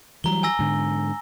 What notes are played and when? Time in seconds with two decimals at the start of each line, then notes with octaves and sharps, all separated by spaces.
0.24 E3 F#3 G3 A#5 G7
0.43 G#5 E6 A#6
0.59 G#2 D3